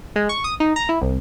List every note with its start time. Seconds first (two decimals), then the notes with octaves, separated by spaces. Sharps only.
0.16 G#3
0.29 C#6
0.44 D#6
0.60 D#4
0.76 A#5
0.89 E4
1.02 C2